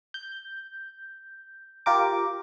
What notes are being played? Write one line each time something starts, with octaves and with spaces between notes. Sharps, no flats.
G6
F4 G4 A#4 D6